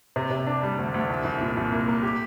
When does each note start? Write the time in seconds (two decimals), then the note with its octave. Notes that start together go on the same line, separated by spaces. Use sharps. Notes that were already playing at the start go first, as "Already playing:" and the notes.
0.16 C3
0.31 C3
0.47 D4
0.63 G3
0.79 D2
0.94 D2
1.10 C2
1.24 C2
1.41 A#2
1.57 C2
1.72 A#3
1.88 A#3
2.03 G4